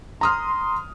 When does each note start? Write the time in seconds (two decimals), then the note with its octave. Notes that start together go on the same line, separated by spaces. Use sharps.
0.21 A#5 C6 D#6 F6